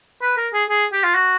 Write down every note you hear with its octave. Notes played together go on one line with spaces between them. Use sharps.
B4
A#4
G#4
G#4
G4
F4
F#4